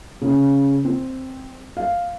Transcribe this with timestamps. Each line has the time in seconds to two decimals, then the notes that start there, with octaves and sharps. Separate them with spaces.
0.22 C#3
0.85 C4
1.77 F5